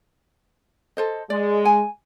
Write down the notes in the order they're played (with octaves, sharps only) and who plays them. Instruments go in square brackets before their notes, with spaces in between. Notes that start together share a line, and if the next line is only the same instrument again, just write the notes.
[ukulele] A4 C5 D#5
[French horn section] G#3 [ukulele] D5
[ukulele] G#5